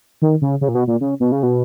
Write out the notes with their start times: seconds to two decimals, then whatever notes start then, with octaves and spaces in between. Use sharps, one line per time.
0.22 D#3
0.42 C#3
0.61 C#3
0.68 A#2
0.75 B2
0.87 A#2
1.01 C#3
1.20 B2
1.32 C#3
1.43 B2